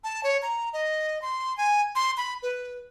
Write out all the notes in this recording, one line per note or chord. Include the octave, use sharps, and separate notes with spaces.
A5
C#5
A#5
D#5
C6
G#5
C6
B5
B4